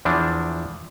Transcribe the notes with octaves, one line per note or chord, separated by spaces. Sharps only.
E2 E3 F3 D4